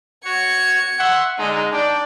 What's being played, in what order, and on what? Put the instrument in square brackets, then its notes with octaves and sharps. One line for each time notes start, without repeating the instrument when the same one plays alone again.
[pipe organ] F#4 C#5 [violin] G#6 C#7
[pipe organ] E5 C6 C#6 [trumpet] F#5
[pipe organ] D3 [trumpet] G#3 [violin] D#4
[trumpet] D4 [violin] D5 [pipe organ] G5